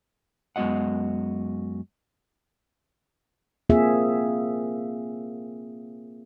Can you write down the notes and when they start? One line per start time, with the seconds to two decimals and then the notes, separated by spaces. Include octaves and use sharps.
0.56 F#2 G#3 B3 F#4 D#5 F#5
3.70 A#3 C4 F4 G#4 E5